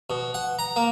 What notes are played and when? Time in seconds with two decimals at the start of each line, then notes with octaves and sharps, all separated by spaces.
0.10 B2
0.34 F#5
0.59 A#5
0.76 A#3